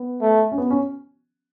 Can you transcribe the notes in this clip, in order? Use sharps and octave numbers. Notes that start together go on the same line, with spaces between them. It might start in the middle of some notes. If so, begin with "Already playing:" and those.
Already playing: B3
A3
C#4
B3
C#4